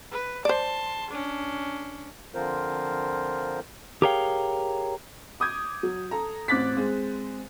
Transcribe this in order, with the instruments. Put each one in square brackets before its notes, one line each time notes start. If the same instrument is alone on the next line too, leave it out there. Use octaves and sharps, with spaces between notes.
[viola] B4
[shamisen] C5 D5 [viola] A5 C6
[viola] C#4 D4
[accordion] D3 F3 C4 F4 A#4 C5
[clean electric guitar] G4 G#4 A#4 C#5 F5 G5
[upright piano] D6 D#6 G6 G#6
F#3
A4 A#5
A1 C4 D6 F#6 A6 B6
G#3 C4